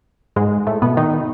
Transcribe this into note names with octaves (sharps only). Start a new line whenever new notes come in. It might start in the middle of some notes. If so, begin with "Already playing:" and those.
G#2 G#3
A2 A3
B2 B3
D#3 D#4